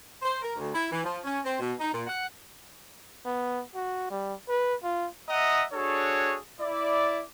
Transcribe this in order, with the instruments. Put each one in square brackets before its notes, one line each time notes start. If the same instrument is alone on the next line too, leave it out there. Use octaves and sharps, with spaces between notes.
[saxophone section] C5
A#4
D2
E4
E3
F3
C#4
C4
B2
D#4
A#2
F#5
[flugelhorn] B3
F#4
G3
B4
F4
[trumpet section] D#5 E5 F#5 A#5 D#6
D4 F#4 G#4 A4 C#5
E4 D5